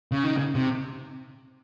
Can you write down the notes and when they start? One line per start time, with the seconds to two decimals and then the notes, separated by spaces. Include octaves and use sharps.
0.12 C#3
0.24 D#3
0.37 C#3
0.55 C3